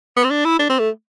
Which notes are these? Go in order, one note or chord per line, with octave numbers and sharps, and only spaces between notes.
B3
C4
D4
E4
D4
C4
A3